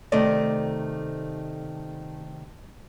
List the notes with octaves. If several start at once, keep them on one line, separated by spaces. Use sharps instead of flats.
C3 D#3 A3 D5 D#5